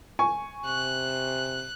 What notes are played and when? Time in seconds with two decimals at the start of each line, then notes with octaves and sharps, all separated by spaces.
0.19 G#5 C#6
0.65 C3 F#6